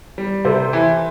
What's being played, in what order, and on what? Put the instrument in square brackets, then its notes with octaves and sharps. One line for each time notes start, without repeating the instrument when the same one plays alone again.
[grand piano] G3
[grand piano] C3 [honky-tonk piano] A4 C5
[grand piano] E3